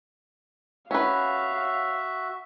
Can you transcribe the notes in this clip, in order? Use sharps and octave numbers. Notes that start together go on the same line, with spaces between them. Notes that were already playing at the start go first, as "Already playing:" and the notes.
C#4 F#4 B4 E5 F5